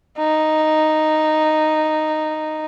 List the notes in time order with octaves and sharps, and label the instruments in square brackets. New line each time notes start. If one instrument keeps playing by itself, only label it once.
[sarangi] D#4